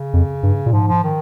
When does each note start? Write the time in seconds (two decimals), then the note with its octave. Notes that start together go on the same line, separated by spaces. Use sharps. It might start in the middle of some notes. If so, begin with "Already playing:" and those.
Already playing: C#3
0.14 F2
0.43 G2
0.66 A#2
0.73 G#2 F3
0.88 F3
1.03 D#3